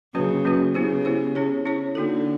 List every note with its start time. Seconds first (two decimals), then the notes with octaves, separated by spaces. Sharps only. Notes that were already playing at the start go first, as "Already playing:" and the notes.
0.15 C#3 F#3 A#3 C#4 F#4 B4
0.45 F#3 A#3 C#4 F#4 B4
0.74 C#3 B3 E4 G4 C5
1.05 B3 E4 G4 C5
1.35 C#4 E4 G#4 C#5
1.65 C#4 E4 G#4 C#5
1.95 D3 A#3 D#4 F#4 A4